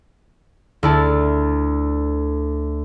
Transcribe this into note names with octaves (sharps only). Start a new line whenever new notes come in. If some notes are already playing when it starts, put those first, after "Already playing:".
D2 E4 A5